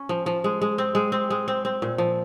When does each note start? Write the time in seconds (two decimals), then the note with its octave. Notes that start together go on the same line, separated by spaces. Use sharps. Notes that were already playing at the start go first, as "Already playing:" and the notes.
Already playing: C#4
0.09 F3
0.26 F3
0.44 G#3
0.61 G#3
0.78 C4
0.95 G#3
1.12 C4
1.30 G#3
1.48 C4
1.65 C4
1.82 A#2
1.98 F3